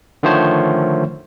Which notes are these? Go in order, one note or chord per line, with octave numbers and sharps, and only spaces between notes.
D3 D#3 F3 A3 C5 C#5